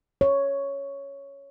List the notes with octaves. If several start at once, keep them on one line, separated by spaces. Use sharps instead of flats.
C#5